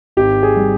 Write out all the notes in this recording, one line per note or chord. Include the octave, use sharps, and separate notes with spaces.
G#1 G4
G#4
G3